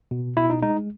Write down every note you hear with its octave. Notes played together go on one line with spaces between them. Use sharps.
B2
B2 E4
D#4
G#3 D#4